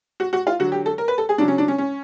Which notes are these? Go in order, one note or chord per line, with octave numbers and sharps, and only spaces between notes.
F#4
F#4
F4
D3 F#3 F#4
G4
A4
A#4
B4
A4
G#4
C#3 F#3 D4
C#4
D4
C#4
C#4